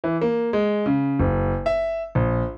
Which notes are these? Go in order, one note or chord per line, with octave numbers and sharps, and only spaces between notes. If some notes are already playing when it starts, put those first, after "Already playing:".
E3
A#3
G#3
C#3
F#1
E5
A#1